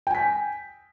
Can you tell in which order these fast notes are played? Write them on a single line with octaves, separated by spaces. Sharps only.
G5 G#5 B6